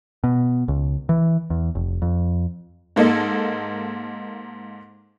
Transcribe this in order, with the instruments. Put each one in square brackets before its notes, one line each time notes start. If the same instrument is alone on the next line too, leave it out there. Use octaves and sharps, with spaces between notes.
[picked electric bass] B2
C#2
E3
E2
F1
F2
[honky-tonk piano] G#2 A#3 A4 D#5